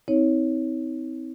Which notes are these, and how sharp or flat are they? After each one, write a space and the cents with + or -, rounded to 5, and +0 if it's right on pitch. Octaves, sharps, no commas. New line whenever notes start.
C4 -15 D#4 +40 C#5 +0